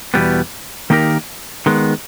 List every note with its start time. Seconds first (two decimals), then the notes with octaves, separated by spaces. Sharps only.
0.14 E2 B2 G3 B3
0.90 D#3 A#3 D#4 G4 A#4
1.66 D#3 G#3 B3